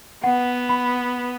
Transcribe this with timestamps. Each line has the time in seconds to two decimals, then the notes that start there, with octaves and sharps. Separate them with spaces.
0.24 B3 F#5
0.69 B5